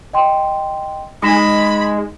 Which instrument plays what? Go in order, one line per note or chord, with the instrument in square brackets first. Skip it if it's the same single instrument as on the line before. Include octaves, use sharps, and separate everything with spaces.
[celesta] D#5 G5 C6
[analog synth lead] G#3 [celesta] D#4 A#6 E7 [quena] B5